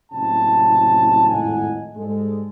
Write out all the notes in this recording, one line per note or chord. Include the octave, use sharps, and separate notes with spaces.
F#1 C2 A2 C3 C#4 A5
G#1 F2 A2 D#5 F#5 G#5
G#2 G3 G#3 A4